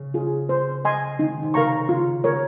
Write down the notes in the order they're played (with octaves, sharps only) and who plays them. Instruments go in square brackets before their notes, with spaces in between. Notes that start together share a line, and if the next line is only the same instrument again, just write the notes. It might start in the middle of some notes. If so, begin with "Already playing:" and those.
Already playing: [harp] C#3
[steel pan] F4 G#4
C5
D#5 G#5 C6
[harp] D#3 [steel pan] D#4
[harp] C3
[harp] C#3 [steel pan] A#4 F5 A#5 C#6
[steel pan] F4
[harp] C#3 [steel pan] A#4 C#5